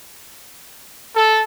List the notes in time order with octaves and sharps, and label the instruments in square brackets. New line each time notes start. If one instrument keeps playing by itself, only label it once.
[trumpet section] A4